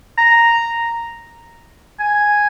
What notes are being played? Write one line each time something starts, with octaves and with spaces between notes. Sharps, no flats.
A#5
G#5